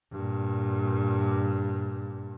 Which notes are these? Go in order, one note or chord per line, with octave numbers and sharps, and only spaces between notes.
G2 A#2